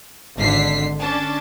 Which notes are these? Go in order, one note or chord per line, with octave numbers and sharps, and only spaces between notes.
G#1 D3 B6 C7
C#4 D4 A5